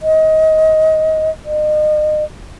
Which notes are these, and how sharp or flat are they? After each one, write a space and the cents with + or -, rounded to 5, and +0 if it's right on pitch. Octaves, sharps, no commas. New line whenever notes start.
D#5 +20
D#5 -35